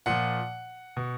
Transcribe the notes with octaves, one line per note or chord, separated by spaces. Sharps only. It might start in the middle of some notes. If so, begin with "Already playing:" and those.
A#2 F3 F#5
B2